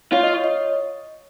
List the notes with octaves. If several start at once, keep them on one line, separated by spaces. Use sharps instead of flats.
F4 C#5
D#5
C#5
D#5